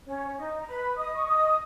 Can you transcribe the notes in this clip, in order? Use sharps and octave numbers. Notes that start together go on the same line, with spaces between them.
C#4 C#5
C#5
D#4 D#5
A#5
B4 B5
D#5 D#6
C#6
D#5 D#6